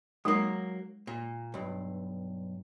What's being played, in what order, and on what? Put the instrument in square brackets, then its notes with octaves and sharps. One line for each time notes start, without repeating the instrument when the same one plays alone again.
[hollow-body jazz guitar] F#3 A#3 [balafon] G#3 D#4
[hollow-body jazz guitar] A#2
B1 G2